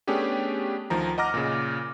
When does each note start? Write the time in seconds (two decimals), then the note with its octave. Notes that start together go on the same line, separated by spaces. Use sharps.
0.07 A3 B3 C#4 D4 G4 G#4
0.90 D2 D#3 F3 A#5
1.18 D#5 F#5 A#5 D6 F6 A#6
1.34 A#2 C#3